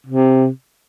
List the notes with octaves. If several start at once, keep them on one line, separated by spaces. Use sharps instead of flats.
C3